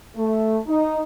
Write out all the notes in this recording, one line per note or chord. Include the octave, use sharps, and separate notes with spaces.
A3
D#4